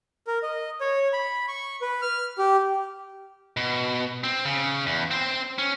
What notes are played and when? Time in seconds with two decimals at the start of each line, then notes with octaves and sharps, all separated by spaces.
0.27 A#4
0.43 D#5
0.81 C#5
1.13 B5
1.48 C#6
1.82 B4
2.02 F6
2.38 G4
3.57 B2
4.24 C4
4.45 C#3
4.86 E2
5.11 C4 C5
5.58 C#4